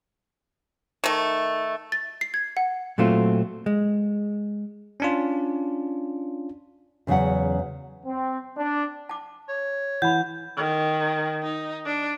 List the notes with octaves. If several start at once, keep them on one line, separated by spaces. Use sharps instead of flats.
D#3 A3
A6
C7
G#6
F#5
A#2 F#3 A3 C4 F4
G#3
C#4 D4 F4
E2 C#3 F#3 E5 F#5
C4
D4
A5 D6
C#5
E3 F#5 B5 G6
D#3
D#4
D4